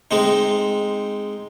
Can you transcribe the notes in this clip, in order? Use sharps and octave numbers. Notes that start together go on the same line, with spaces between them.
G#3 C4 D#4